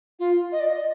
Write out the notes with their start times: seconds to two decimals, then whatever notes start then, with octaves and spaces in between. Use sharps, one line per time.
0.19 F4
0.52 D#5
0.60 D5
0.67 D#5